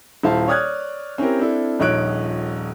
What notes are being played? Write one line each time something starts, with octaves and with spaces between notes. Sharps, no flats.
D#1 E4 C5 F5 A5
C#5 D5 D#6 F6 F#6 G#6
C4 C#4 E4 G4 A#4
C4 D4 E4 A4
D#1 A#1 D#4 C#5 F#6 D7